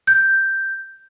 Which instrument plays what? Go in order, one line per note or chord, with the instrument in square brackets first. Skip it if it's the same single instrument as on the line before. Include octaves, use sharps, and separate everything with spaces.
[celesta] G6